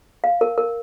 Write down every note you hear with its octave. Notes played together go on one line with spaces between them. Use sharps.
F5
A#4
A#4